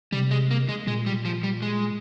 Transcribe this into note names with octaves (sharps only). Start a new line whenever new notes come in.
C3 G3
G#3
A#3
G#3
A#2 G#3
G3
F3
G3
G#3